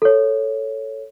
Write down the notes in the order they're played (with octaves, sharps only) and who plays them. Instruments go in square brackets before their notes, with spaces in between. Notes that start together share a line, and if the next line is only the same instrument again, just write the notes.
[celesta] A4 C#5